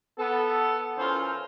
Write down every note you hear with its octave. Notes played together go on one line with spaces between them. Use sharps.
B3 A4
E3 C#4 F4 A4 A#4 C5